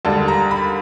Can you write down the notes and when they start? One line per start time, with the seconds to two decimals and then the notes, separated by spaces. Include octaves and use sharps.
0.05 D#2 D3 G3 A5
0.28 A#5
0.51 B5